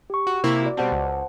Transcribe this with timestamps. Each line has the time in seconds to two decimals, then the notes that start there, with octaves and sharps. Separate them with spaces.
0.10 G4 C#6
0.27 F#4
0.44 C3 A#3 E4
0.62 F#4 D5
0.77 B2 G3 C4 C5 F#5 A5
0.92 C#2